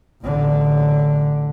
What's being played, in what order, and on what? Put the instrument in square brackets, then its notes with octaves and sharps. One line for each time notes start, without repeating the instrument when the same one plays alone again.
[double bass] A1 D3